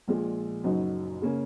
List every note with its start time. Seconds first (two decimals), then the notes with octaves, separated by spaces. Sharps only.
0.08 A#1 A#2 G#3
0.64 F#1 F#2 F#3 D#4 F#4
1.22 C#3 A#3 C#4